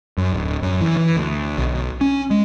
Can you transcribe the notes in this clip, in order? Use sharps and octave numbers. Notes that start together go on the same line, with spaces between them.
F#2
D1
F#2
E3
E3
D2
B1
C#4
G#3